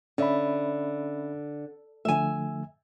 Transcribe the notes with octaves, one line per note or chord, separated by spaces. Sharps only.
D3 C#4 E5 B5
D3 F3 A3 E5 G#5